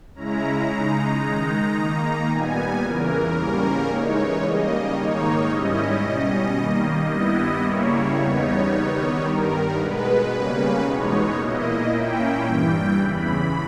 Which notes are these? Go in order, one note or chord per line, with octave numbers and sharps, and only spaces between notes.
C#3 G#3 C#4 E4 A#5
C#3 G#3 D#4 A#5
D#3 G#3 D#4
D#3 A#3 D#4
A#2 G3 B3 G#5
E2 C#3 E3 A#4
G#2 G3 A#3 C#4
C#3 E3 G#3 D#4 C#5
C#3 G3 A#3 D#5
G#2 D#3 A#3 D#4 C#5
G#2 G3 C#4 E4 D#5
B2 G3 C#4
D#3 G3 A#3
G2 G3 B3 E4 D#5
C#3 G3 A#3 E4 C#5
E2 C#3 G3 B3 D#4
D#3 G3 B3 D#4
G2 D#3 G3 A#4
B2 G#3 B3 B4
C#3 G3 A#3 C#4
E2 B2 G#3 B3 D#4 C#5
A#2 A#3 E4 D#5
A#2 A#3 C#4 E4 G5
G2 E3 G3
E2 C#3 E3 B5